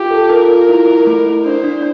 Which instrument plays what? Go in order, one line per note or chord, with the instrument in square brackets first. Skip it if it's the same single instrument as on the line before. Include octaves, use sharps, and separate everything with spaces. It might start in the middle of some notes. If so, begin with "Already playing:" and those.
Already playing: [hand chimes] F4 [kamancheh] G4
[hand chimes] A4
[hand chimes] F4 [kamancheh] A#4
[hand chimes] F4
E4
E4
A3
E4
[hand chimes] D4 [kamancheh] C5
[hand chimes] D4